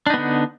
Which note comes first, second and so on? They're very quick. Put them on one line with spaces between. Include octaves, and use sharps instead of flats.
D4 D#4 B3 D3